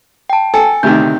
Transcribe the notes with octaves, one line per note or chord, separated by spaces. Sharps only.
G5 A5
A4 G#5
D2 C3 D#3 G6